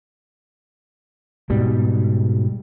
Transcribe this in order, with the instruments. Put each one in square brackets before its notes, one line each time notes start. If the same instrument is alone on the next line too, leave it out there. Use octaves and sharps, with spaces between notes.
[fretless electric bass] G#2 B2 G3